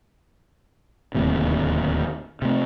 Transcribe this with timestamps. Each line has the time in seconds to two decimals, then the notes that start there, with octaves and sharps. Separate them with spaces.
1.15 D1 D#2 A2 C3
2.42 C3 A3